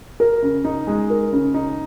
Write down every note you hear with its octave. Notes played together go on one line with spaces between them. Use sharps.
A#4
C#3
D#4
G#3
A#4
C#3
D#4